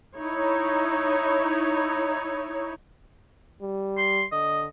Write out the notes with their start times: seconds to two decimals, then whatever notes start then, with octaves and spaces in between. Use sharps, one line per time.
0.17 D#4 E4 C#5
3.62 G3
3.98 C6
4.32 D3 D#5